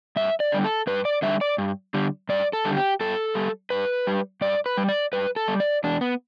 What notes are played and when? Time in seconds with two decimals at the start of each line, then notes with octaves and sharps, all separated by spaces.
0.16 G2 E5
0.40 D5
0.52 D3 G3
0.64 A4
0.87 G2 B4
1.05 D5
1.22 D3 G3 E5
1.41 D5
1.58 G2
1.94 D3 G3
2.29 G2 D5
2.53 A4
2.65 D3 G3
2.76 G4
3.01 G2 A4
3.35 G3
3.70 G2 B4
4.07 G3
4.41 G2 D5
4.66 B4
4.77 G3
4.89 D5
5.13 G2 B4
5.36 A4
5.48 G3
5.60 D5
5.84 E2 D4
6.01 B3